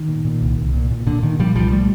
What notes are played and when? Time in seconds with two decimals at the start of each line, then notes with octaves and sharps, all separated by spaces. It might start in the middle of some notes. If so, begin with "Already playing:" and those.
Already playing: D#3
0.08 A#2
0.25 A#2
0.42 C2
0.58 C2
0.74 A#2
0.90 A#2
1.07 A#2 D3
1.23 A#2 D#3
1.39 A#2 F3 G3
1.55 C2 F3 G3
1.72 A#2 G3 A3